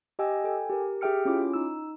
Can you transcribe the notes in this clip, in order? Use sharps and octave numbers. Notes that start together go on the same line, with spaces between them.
G4 D#5 G5 G#5 E6
A4 G5 G#5
G4 A#4
G4 G#4 E5 G5 F6 C#7
C#4 E4 F4 D6
D#4 E6